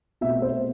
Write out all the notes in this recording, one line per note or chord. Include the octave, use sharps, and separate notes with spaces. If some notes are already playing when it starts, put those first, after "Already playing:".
B2 A3 C4 E5
C5